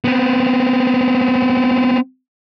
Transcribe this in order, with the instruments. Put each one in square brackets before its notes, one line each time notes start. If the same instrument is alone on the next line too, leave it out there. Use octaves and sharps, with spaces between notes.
[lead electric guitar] B3 C4